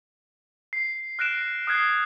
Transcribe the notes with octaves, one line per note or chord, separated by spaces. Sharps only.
C7
F6 F#6 A#6 D7 E7
D#6 F6 F#6 G#6 C7